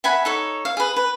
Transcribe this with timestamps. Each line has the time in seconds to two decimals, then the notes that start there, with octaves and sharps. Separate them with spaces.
0.04 E5 F#5 G#5 B5
0.25 D#4 A4 C#5
0.65 F5
0.77 G#4 B4
0.96 B4